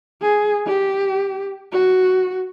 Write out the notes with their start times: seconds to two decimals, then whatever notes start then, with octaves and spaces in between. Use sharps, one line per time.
0.22 G#4
0.67 G4
1.72 F#4